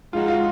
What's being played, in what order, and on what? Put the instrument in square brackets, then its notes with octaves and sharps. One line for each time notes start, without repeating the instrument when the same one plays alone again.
[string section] F3 G#3 D#4 F#4 [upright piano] F4
[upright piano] F4